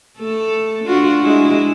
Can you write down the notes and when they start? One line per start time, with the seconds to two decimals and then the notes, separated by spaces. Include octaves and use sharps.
0.18 A3 A4
0.85 D4 F4 F#4
1.20 G#3 D4 E4